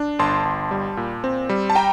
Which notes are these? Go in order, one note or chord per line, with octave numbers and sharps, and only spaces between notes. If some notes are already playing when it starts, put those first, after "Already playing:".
Already playing: D4
G1 A5 C6
G1
G3
A#2
C4
G3
A5
G5 A#5